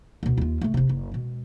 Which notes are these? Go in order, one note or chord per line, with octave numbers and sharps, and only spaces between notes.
D2 B2
D#2 F4
C#3 A3
F1 C3
F#1
B2 G#3